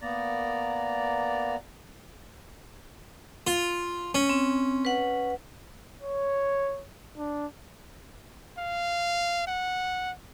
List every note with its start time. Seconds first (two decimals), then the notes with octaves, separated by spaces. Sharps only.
0.01 A#3 B3 D5 A#5
3.47 F4
4.15 C#4
4.30 C4
4.85 B4 F#5
6.02 C#5
7.17 D4
8.58 F5
9.47 F#5